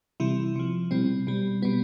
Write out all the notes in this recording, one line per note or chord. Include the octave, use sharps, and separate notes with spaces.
C3 E3 G3 E4
C3 F3
B2 G3 C4
B2 G3
B2 G3 B3